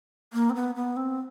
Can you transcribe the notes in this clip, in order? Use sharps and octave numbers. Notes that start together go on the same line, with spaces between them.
A#3
C4
B3
B3
C4